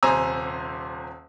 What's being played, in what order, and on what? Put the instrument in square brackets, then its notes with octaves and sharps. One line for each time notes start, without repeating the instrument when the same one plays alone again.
[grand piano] D#1 C3 C5 G#5 A#5 E6